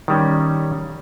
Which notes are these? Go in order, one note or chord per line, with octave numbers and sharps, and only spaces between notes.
D#3 G3 C#4